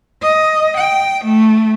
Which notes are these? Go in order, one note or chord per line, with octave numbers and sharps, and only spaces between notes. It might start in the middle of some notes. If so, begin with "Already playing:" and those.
D#5
G5
A3